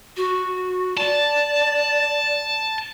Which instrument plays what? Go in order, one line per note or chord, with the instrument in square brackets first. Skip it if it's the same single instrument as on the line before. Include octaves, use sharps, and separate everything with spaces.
[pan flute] F#4
[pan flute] D5 [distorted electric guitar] A5